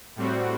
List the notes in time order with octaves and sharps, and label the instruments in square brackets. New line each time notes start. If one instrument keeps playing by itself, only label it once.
[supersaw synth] A2 G3 C4 F#4